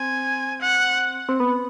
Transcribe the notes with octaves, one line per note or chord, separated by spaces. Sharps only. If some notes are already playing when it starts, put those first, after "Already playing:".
Already playing: C4 G#5
F#5
C4
B3